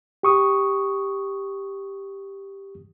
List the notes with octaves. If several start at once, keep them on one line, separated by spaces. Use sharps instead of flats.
G4 C#6 D#6